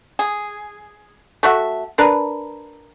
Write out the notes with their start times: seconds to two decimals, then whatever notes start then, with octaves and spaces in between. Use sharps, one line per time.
0.19 G#4
1.43 A3 F#4 E5
1.98 D4 A#4 B4